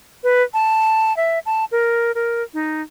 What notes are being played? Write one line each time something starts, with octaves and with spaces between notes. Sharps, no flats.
B4
A5
E5
A5
A#4
A#4
D#4